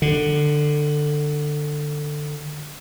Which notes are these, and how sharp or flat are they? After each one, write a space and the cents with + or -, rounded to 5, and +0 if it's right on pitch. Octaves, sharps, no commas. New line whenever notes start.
D3 +15